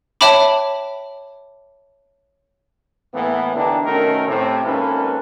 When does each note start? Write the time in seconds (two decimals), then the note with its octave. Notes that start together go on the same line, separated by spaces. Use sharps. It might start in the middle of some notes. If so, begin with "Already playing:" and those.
0.21 C#5 E5 G5 A5 B5 D6
3.13 A2 E3 A#3 B3
3.55 D#2 D3 E3 D4 D#4 G4
3.84 B2 D#3 A3 C#4 A#4
4.27 A2 C3
4.64 G#1 G#2 A#3 C#4 A4 B4